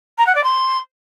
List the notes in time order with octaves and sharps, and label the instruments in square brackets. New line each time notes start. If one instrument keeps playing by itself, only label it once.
[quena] A#5
F#5
D5
C6